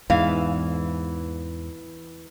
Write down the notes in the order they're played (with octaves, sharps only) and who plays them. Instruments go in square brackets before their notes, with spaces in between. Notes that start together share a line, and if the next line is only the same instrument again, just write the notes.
[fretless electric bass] E2 G#2 [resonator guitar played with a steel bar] E3 F5